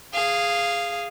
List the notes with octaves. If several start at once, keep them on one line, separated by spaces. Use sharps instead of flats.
G#4 F5